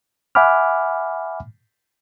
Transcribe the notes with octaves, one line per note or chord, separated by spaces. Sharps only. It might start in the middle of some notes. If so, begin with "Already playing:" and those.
E5 F#5 G#5 B5 D6 F6